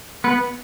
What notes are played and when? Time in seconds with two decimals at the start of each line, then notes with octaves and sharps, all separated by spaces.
0.24 B3 B4